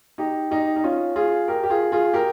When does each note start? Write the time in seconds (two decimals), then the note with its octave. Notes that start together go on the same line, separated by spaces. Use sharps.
0.18 D#4 G4
0.51 D#4 G4
0.76 D#4
0.84 C#4 F4
1.16 F4 G#4
1.48 G4 A#4
1.63 G4
1.70 F4 G#4
1.92 F4 G#4
2.13 G4 A#4